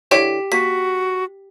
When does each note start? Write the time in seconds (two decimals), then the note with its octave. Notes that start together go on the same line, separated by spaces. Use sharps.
0.11 D3 E4 G4 C#5 G5 B6
0.52 A#3 F#4 B6